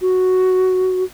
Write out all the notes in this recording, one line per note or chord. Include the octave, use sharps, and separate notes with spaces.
F#4